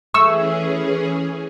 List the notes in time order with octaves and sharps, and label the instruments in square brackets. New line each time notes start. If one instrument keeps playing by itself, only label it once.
[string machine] E3 C#4 G#4 [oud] A3 [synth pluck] C#6 E6